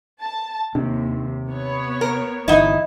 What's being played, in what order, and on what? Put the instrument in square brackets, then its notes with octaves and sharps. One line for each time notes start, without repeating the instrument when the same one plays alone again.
[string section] A5
[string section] D#2 [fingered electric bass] C3 [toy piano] D4
[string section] B3 C#5
[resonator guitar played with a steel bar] A#4
[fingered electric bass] G1 E3 [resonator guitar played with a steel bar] D#4 E4 [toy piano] D#5 F#5 B5